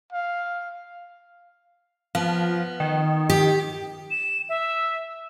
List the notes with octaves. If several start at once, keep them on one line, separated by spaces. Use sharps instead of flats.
F5
F3 B3
D#3
G4
E7
E5